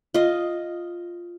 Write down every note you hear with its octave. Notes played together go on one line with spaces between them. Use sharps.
F4 D#5